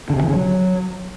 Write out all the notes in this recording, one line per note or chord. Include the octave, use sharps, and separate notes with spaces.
D3
C3
E3
C#3
F#3